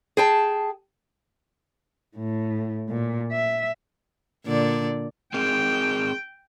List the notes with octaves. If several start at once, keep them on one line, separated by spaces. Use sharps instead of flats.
G#4 G5 A5
A2
A#2
E5
A#2 D3 D5
C4 G#4 A#4 G5